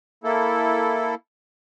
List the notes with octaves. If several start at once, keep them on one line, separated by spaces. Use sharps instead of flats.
A#3 E4 A4